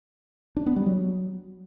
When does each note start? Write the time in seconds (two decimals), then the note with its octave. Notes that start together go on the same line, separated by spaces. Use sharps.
0.57 D4
0.66 B3
0.76 G3
0.86 F#3